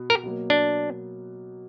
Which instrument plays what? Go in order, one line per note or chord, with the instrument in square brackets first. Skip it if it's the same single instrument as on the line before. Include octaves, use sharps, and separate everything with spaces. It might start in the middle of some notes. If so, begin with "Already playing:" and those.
Already playing: [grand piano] B2 B3
[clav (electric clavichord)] A#4
[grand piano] B2 F#3 A#3
[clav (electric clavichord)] D4